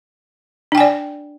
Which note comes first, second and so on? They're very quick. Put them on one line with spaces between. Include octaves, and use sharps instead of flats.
D4 G5 G#5 D5